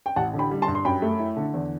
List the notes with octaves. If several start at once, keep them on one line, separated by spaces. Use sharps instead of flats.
G5
A1 F#5 A5
D3
G5 B5
G3
A5 C6
G2
C6
F#2 G5 B5
A3
E4
D3
E2